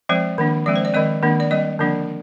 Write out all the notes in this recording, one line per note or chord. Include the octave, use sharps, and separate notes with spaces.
F3 G#3 C4 C5
D#3 A#3 D4
F3 G#3 C4 D5
C5
D5
D#3 G#3 C4 D#5
D#3 A#3 D4
D5
G3 C4 D#5
D3 F3 A#3 D4